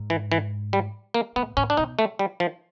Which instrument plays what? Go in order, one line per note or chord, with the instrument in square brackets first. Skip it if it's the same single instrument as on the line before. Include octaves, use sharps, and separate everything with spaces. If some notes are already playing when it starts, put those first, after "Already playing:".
Already playing: [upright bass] G#2
[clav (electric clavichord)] E3
E3
G3
A#3
[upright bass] A2 [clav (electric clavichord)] B3
[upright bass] A2 [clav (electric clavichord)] C#4
[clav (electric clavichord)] D4
[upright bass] B2 [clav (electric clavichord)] D#4
[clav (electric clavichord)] A3
G3
F3